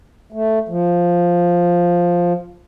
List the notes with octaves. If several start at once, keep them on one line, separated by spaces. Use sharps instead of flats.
A3
F3